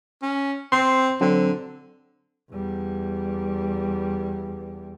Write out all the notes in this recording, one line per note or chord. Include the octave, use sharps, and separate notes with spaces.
C#4
C4 C6
D3 F#3 C4
E2 G3